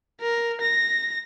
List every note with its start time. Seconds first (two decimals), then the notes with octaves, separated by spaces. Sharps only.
0.21 A#4
0.61 A#6